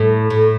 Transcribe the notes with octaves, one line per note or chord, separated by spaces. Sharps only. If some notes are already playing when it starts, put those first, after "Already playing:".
Already playing: A2
A2